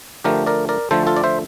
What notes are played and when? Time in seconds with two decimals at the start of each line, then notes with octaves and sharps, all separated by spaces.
0.24 D3 F3 A3 G4 A#4
0.47 A#4 D5
0.69 A#4 D5
0.91 D3 F3 A3 A4 C5
1.07 F4 A4
1.17 D5
1.24 C5 E5